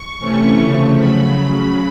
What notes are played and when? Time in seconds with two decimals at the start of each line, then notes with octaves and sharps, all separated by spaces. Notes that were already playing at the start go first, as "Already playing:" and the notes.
Already playing: C#6
0.19 C3 E3 A3 C#4
0.58 C#3 F3 A3
0.98 C#3 F#3 B5